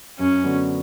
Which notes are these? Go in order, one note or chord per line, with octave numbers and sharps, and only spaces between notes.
F#2 C#4
D3 F#3 B3 F#4